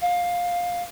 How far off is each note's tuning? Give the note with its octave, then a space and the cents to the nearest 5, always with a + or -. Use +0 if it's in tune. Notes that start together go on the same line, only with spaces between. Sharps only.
F5 +15